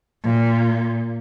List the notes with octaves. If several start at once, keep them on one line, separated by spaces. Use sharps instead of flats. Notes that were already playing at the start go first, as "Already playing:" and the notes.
A#2